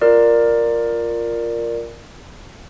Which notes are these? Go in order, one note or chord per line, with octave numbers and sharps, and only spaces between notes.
F4 A#4 D5